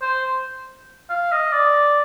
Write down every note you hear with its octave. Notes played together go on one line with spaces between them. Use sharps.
C5
F5
D#5
D5